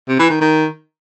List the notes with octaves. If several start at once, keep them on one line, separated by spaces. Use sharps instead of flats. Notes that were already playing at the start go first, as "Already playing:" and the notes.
C3
E3
D#3
D#3